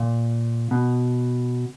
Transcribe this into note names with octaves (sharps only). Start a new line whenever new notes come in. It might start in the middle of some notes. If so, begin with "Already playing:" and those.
Already playing: A#2
B2